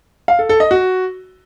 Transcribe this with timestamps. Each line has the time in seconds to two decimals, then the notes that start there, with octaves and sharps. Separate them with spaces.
0.28 F5
0.39 A4
0.49 A4
0.60 D#5
0.71 F#4